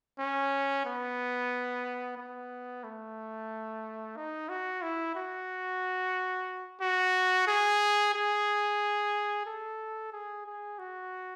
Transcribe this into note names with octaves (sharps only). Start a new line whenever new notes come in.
C#4
B3
B3
A3
D#4
F#4
E4
F#4
F#4
G#4
G#4
A4
G#4
G#4
F#4